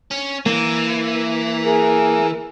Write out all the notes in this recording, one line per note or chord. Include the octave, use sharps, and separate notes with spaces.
C#4
E3 A#3
G#4 A#4